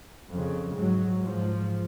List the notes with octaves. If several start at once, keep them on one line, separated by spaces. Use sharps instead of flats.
F2 C#3
G#2 F#3
G#2 F3